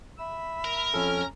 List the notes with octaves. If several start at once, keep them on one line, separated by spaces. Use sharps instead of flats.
E5 B5 E6
A#4
F2 C#4 A4 F6